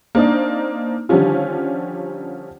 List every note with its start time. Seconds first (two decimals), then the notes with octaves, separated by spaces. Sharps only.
0.15 A#3 C4 D4 D#4
1.09 D3 D#3 F3 G3 C#4 F4